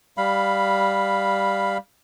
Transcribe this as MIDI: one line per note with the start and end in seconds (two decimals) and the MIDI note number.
0.17 1.78 55
0.17 1.78 77
0.17 1.78 83